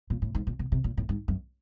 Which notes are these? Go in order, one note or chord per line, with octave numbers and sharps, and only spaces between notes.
A#2
A2
G#2
A#2
B2
C3
A#2
A2
G#2
F#2